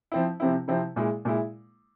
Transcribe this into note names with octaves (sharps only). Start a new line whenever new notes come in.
F3 C4 E4
C3 F3 C4 E4
C3 F3 C4 E4
A#2 G#3 E4
A#2 G#3 E4